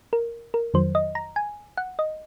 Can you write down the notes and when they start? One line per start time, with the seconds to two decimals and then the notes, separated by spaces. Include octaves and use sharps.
0.13 A#4
0.54 A#4
0.74 F2 D#3 F#3 C5
0.95 D#5
1.15 A#5
1.36 G#5
1.77 F#5
1.99 D#5